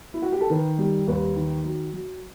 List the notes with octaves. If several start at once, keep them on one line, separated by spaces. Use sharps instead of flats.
E4
F#4
G4
A4
D#3 B4
G3
D#2 B4
D#3
F#3
F#3